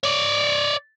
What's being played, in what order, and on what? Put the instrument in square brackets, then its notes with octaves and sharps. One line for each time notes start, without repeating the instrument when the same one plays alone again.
[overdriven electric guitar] C#5 D5